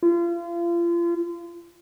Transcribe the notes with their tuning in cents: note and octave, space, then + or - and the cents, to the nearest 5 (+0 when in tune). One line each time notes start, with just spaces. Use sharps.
F4 -35